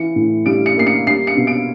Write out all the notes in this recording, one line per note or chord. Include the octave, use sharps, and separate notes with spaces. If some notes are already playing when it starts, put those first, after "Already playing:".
Already playing: E3 C#7
A2
G3 D7
C#7
A#3 C7
C#7
G3 C7
C#7
B2
D7